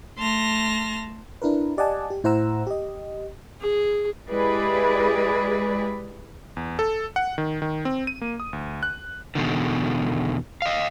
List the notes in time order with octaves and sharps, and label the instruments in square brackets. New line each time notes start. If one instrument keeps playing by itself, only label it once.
[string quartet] A3 A5 C6 F6 A#6
[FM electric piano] D4 E4 A#4 B4
G4 D5 D#5 F#5 G#5 A5
G4
A2 E4 C5 F#5 A#5 E6
G4 D#5
[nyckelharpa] G#4
[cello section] G#3 E4 G4 G#4 B4 D5
[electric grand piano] E2
A4
F#5
D#3
D#3
C4
D#7
A#3
D#6
D2
F#6
[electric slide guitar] E2 B2 D3 D#3
D#5 F5